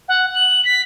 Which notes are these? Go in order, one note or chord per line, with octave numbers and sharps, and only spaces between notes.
F#5
F#7
B6